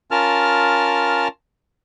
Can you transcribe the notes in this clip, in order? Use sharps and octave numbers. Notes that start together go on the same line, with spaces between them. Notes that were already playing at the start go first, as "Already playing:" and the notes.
C#4 F4 A#4 A5 F6